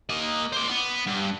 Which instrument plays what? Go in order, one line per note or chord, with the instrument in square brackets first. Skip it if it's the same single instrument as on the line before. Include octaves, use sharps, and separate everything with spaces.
[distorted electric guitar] A#3 D#5
C5 D5
B3
G2